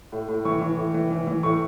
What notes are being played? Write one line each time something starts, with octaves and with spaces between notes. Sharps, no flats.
A2
A2
E3 C#6
E3
A2
E3
E3
E3
A2 C#6